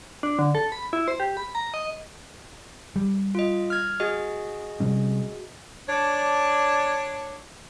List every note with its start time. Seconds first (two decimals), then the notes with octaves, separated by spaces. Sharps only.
0.23 D4
0.39 D3
0.55 A4
0.72 B5
0.93 E4
1.08 C5
1.20 G4
1.37 B5
1.55 A#5
1.74 D#5
2.96 G3
3.35 F4 D#5
3.70 F6 G#6
4.00 F#4 G#4 D#5
4.80 C3 G3 C#4
5.88 D4 C#5